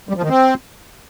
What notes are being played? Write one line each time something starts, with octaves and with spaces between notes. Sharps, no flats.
G3
F3
D#3
C4